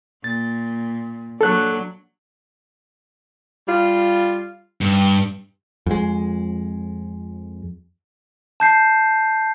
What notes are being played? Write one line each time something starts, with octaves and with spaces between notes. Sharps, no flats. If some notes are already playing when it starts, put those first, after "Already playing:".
A#2 A6
F#3 A#3 D4 A4 F#6
G3 F4
G2
F2 G#3
A5 G6 C7